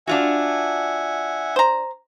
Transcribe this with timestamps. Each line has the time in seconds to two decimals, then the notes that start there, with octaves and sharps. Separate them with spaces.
0.07 D4 F4 F#4 E5 F#5 G#5
1.56 C5 A#5